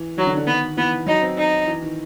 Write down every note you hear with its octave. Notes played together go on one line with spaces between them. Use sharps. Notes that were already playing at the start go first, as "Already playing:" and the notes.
Already playing: E3
D#3 F#3
D3
D3
D#3 B3
E3 B3
F#3 D#4
C4
D#4
E3
D#3